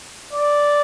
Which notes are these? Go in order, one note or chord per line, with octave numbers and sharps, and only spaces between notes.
D5